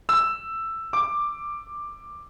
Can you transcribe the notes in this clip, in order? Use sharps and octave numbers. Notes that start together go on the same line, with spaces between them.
E6
D6